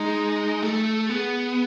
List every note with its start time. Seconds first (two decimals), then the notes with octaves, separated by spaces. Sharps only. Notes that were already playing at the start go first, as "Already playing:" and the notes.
Already playing: G#3 D#4
0.62 A3 A4
1.09 B3 G#4